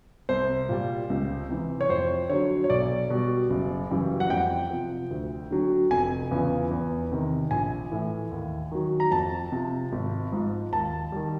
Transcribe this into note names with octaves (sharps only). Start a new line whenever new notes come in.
C2 C5
A#2 G3
C#2
C3 E3
C#5
F2 C5
D3 F#3 C#5
C#5
B1 D5
B2 G3
F#1
F#2 C#3 E3 G3
F#5
F2 G5
C3 F3
D2
D3 F#3
F1 G#5
E2 C#3 F3
E2
C3 D#3
A#1 G#5
A2 E3
D#2
D#3 F#3
A#5
F2 A5
C3 F3
G#1
G#2 F3
D#2 A5
D#3 G3